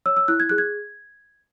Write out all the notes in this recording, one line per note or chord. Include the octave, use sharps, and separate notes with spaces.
C#5 E6
E6
E4 F#6
G#6
G#4 F#6
G#6